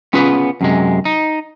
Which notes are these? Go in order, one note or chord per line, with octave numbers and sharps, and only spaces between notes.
B3 C#4 F4 G#4 B4
F#2 C3 G#3
D#4